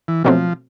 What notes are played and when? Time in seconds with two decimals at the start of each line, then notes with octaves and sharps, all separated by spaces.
0.08 E3
0.24 B2 F3 F#3 A3 C4